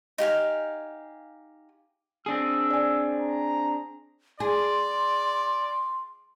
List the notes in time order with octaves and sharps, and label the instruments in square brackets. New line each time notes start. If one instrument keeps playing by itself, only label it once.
[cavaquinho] D#4 G4 F5 G#5
[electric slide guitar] C4 D4 G#4 [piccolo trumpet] E6
[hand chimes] D5 G#5
[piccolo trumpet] A#5
[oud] G#4 [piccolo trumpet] D5 [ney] C6